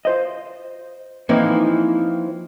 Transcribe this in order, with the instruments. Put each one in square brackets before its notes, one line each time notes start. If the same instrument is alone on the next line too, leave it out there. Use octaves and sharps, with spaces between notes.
[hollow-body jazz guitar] F4 C5 D#5
[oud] E3 F3 D#4 [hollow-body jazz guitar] A#3 C4 A4